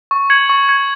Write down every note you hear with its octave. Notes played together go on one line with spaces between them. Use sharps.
C#6
G#6 C#7 F#7
C#6
G#6 C#7 F#7